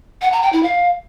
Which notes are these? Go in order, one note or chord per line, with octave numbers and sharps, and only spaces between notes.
F#5
A#5
G5
E4
F5